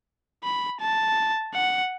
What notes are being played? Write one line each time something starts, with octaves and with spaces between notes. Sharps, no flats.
B5
A5
F#5